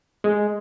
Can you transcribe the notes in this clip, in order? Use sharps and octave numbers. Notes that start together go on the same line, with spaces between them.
G#3